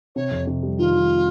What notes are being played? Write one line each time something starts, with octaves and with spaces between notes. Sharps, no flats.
C3 C#5
F2
C3
G3
D#3 F4
D#3